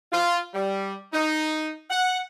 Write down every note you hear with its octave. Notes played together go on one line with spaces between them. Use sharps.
F4
G3
D#4
F#5